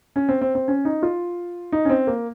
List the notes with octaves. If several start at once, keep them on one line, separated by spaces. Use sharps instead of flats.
C#4
C4
C4
C4
C#4
D#4
F4
D#4
C#4
C4
A#3